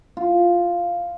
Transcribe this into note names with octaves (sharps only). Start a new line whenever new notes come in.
F4